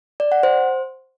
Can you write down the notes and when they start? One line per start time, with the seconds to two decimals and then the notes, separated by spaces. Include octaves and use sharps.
0.20 D5
0.32 F#5
0.43 C5